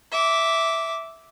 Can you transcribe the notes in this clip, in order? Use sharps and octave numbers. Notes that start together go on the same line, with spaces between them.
E5 D6